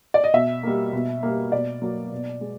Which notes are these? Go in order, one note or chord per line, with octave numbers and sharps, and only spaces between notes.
D5
D#5
B2 E5
G3 A#3
B2
G3 A#3
B2 D5
F#3 A#3
B2
G#3